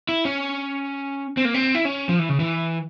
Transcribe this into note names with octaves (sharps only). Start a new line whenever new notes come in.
E4
C#4
C4
A#3
C4
E4
C#4
F3
E3
C#3
E3